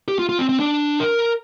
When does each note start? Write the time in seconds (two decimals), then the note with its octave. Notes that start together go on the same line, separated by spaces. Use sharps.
0.08 G4
0.19 F4
0.29 F4
0.38 C4
0.49 C4
0.60 D4
1.00 A#4